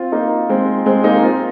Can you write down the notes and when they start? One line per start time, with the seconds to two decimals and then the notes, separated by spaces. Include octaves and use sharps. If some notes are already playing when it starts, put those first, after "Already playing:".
Already playing: C4 F4
0.12 A#3 D#4
0.49 G#3 C4
0.86 G#3 C4
1.04 A#3 D#4
1.23 C4 F4